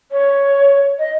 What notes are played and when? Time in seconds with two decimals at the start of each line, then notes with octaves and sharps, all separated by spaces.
0.11 C#5
0.99 D#5